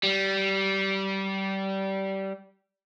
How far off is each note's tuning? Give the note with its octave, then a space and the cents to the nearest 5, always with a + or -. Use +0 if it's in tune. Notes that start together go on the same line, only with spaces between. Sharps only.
G3 -20